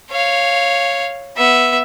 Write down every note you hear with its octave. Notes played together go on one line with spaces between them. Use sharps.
C#5 F5
B3 E5